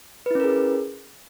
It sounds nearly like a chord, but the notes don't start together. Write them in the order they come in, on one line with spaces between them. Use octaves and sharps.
B4 E4 C#4 A#4 G#4